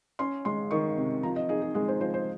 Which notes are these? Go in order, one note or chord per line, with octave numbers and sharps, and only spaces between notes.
C#4 C6
G#3 C6
D#3 C#6
C3
F3 A#5
D#5
D#4 G#4
G#4
G#3 G#4
C5
F3 C5
C5